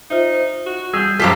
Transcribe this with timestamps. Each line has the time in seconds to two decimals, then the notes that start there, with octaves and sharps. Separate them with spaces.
0.10 D#4 F4 C5 E5
0.66 F#4
0.93 G3 G#4 E6 G6
1.20 F#2 F3 F4 G4 A4 B6